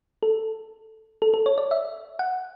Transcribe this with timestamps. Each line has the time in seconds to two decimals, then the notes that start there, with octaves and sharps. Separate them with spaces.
0.23 A4
1.22 A4
1.34 A4
1.46 C#5
1.58 D5
1.71 E5
2.19 F#5